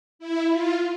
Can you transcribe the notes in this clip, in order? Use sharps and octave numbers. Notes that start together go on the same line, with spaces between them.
E4
F4